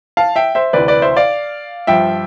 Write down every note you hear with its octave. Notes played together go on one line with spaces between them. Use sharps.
F5 A5
E5 G5
C5 E5
D2 C3 E3 B4 D5
B4 D5
C5 E5
D5 F5
G2 F3 E5 G5